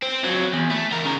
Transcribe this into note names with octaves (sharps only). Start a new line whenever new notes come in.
C4
F2 F#3
E2
A3
E2 A#4
C#3 A#4